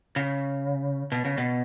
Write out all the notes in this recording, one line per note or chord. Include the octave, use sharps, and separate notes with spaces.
C#3
B2
C#3
B2